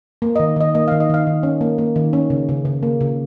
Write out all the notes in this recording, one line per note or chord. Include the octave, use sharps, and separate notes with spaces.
A#3
D#3 D#5
D#3 D#5
A#3 D#5
D#3 F5
D#5
D#3 F5
D#3
C#4
A#3
A#3
D#3
C#4
C#3
C#3
C#3
A#3
C#3